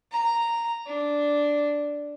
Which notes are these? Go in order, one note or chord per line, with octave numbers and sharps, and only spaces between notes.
A#5
D4